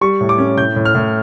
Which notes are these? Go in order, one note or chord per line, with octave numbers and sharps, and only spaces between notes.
G3 C#6
A2
D6
C#4
A2 G6
A2
F6
A2